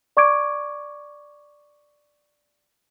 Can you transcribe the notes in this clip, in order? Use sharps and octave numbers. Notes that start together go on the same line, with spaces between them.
D5 C#6 D6 G#6 D7